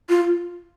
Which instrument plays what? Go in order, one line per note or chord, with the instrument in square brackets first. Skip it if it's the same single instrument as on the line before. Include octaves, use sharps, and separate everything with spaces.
[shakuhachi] F4